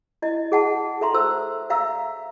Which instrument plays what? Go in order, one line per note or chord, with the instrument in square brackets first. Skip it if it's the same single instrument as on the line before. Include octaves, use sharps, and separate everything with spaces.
[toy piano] E4 D#5
G#4 F#5 A5
A4 E5 A#5 C6
A4 C5 E6
E5 F5 A#5 E6